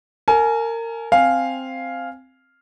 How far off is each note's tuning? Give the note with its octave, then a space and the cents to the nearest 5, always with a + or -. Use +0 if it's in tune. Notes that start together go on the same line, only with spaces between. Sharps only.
A#4 -25 G#5 +25
C4 +0 F5 +0 G#5 +0